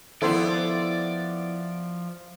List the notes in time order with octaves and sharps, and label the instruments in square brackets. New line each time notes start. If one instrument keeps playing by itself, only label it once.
[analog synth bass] F3 [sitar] B3 E4 [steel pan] A4 C5 C6 [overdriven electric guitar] D5